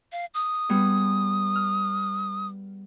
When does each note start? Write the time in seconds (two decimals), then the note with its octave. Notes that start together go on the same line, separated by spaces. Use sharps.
0.12 F5
0.34 D#6
0.69 G3 B3 G#4
1.55 F6